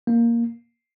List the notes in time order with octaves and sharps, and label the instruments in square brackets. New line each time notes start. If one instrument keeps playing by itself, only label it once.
[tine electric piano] A#3